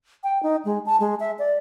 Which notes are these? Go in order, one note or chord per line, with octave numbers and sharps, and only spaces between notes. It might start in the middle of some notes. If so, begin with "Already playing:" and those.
G5
D#4
G#3
A5
G#3
E5
D5